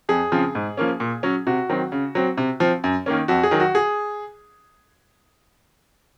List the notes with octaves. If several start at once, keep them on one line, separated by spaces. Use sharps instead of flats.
F2 G#4
C#3 F3 C4
G#2
F3 A#3 C#4
A#2
F#3 C#4
C3 F#4
D#3 F#3 C4
C#3
F#3 C4
C3
F3 C4
F#2
D#3 A#3 C#4
F2 F#4
G#4
D#3 F#3
F#4
G#4